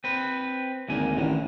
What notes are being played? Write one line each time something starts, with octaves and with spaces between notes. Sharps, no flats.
C4 B4
G#1 D2 A#3 G#5
A1 A2 D3 D#3